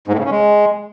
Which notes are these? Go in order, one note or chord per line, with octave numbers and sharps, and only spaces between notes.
G#2
A2
C#3
C#4
G#3